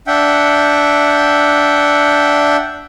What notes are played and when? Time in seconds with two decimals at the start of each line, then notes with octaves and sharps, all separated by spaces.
0.07 D4 E5 F#5 G5